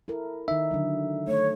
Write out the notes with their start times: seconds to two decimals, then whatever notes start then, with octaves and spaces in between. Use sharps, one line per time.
0.08 E4 A4 A#4
0.48 D#3 D#4 E5
0.71 D3 D#3 F#3
1.28 A3 C#5